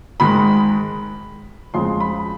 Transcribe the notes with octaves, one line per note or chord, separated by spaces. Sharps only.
G#2 D#3 G#3 B5
F2 C#3 F3 G#3 C6
B5